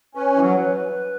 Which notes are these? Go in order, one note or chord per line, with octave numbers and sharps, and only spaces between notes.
C#4 B4
E3
F#3